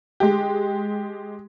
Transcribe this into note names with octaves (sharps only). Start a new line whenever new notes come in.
G#3 G4